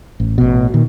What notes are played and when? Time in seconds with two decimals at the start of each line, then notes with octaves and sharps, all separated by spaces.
0.20 A1
0.38 A1 B2
0.74 A#2 D#3